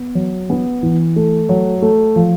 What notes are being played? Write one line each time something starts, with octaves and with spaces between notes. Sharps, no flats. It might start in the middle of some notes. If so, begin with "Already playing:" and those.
Already playing: B3
F#3
B3
E3
A3
F#3
A3
F3